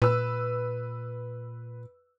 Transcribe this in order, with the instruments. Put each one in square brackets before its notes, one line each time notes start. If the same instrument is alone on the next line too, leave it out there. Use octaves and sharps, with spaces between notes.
[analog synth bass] A#2 [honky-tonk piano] B4 E6